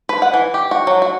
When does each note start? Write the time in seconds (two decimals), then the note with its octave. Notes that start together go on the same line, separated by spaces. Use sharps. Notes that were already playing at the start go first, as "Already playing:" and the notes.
0.09 B4
0.22 F#5
0.34 E3
0.54 G4
0.71 F#4
0.87 F#3
1.02 F#4